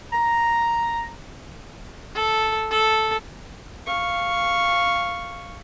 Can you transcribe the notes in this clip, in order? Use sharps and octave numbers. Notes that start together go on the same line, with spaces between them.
A#5
A4
A4
F5 C#6